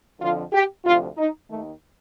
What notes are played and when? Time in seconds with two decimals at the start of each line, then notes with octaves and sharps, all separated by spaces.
0.20 F2 D3 F3 F4
0.53 G4
0.85 D2 C3 F3 F4
1.17 D#4
1.49 D#2 D#3 A3